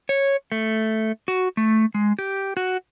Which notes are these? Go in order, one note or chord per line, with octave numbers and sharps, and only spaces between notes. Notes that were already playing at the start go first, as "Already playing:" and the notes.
C#5
A3
F#4
A3
G#3
G4
F#4